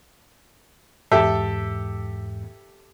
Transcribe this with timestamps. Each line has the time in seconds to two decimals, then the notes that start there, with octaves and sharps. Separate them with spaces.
1.12 E2 G#2 G4 A4 E5